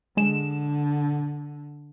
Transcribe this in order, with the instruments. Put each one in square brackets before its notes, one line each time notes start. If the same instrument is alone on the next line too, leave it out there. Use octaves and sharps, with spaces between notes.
[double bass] D3 [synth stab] G#3 E7